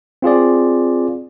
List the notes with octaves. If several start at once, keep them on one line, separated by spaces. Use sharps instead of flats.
C4 F4 G#4 D5